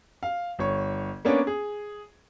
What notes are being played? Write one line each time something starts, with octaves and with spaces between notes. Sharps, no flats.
F5
G1 C#5
A#3 B3 C#4 D4 C#5
G#4